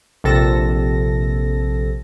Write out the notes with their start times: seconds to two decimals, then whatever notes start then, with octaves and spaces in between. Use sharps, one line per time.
0.24 A#1 C3 A4 A#6